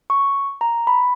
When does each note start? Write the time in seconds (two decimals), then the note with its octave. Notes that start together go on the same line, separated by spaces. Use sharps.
0.10 C#6
0.61 A#5
0.87 B5